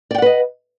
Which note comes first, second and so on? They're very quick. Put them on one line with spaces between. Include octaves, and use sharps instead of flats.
D5 G5 F#5 B4 D#5